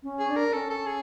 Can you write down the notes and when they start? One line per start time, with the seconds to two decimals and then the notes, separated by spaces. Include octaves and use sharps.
0.03 C#4
0.20 G#4
0.28 D4
0.36 A#4
0.47 D4
0.53 C#4 A4
0.70 A4
0.86 G#4